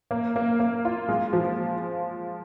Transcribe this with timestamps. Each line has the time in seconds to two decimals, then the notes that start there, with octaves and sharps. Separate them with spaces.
0.11 A#3
0.36 A#3
0.60 A#3
0.85 F4
1.08 G#3
1.33 F3